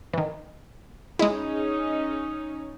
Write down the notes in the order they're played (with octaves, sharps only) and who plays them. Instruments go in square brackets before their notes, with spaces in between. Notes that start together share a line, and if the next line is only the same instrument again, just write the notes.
[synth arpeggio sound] D#3 E3
[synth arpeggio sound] G#3 E4 [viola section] C#4 D#4 [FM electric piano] G#4 D#5